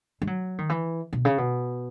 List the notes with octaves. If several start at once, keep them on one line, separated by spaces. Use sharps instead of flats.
G#3
F#3
D#3
E3
B2
C#3
B2